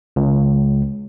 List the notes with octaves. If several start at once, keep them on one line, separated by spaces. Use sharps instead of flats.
C#2